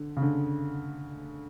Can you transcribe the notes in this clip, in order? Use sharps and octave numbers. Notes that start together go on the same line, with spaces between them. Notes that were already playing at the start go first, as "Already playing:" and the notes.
Already playing: D3
C#3
D3